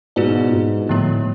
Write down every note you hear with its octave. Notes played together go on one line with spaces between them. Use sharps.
G#2 B2 B3 F#4 B4 D5
G#2
A2 D3 F3 B3